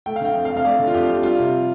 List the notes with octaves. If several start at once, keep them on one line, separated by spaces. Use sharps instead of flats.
A3 G5
F5
D3 G5
F2
F5
F2
F5
A3 D5
D3
F4
F2 G4
F2
G3 F4
C3